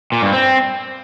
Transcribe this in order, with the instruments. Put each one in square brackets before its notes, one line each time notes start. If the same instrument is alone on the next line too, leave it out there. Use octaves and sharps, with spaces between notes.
[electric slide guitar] A#2
G2
C4